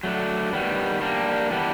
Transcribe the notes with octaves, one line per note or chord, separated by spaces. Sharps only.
F#3 A3 D4
D#3 G3 B3
G3 A#3 D4
E3 G3 B3 D4